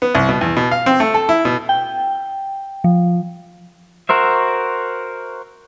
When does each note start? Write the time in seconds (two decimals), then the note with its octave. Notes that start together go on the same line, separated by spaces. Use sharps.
0.02 B3
0.15 C2
0.29 B2
0.41 E2
0.56 B2
0.71 F5
0.86 C4
1.00 A3
1.14 A4
1.29 E4
1.45 B2
1.69 G5
2.84 F3
4.09 F#4 A#4 C5 E5